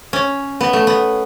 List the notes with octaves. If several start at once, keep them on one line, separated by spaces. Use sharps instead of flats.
C#4
B3
A3
B3